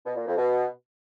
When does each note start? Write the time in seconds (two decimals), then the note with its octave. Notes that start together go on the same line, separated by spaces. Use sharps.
0.06 B2
0.16 A#2
0.27 F2
0.38 B2